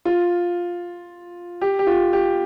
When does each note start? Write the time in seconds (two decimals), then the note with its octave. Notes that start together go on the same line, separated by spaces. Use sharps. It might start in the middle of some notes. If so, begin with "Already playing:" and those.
0.05 F4
1.61 G4
1.79 G4
1.87 F4
2.13 G4